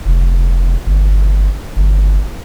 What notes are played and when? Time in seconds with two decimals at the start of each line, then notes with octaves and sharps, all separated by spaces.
0.05 F1
0.86 G1
1.76 G1